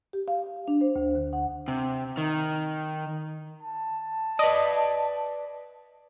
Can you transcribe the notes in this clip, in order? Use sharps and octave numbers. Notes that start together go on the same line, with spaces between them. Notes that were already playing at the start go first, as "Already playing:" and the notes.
G4
F5
D4
C5
D2
D3
F#5
C3
D#3
A5
B4 D5 D#5